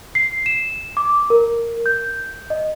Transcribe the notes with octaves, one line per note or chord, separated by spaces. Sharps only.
C7
E7
D6
A#4
G6
D#5